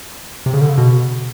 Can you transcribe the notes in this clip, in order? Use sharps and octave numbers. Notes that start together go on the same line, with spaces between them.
C3
C#3
D3
C#3
B2